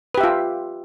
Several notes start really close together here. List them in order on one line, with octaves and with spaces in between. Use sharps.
B4 G4 E5 F4